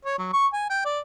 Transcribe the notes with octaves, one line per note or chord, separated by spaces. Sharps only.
C#5
F#3
C#6
G#5
G5
D5